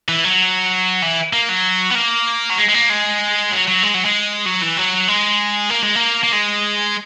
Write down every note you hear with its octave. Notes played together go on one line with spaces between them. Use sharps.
E3
F#3
E3
A#3
F#3
B3
A#3
F#3
G#3
G#3
A#3
G#3
F#3
F#3
G#3
F#3
G#3
F#3
E3
F#3
G#3
A#3
G#3
A#3
A#3
G#3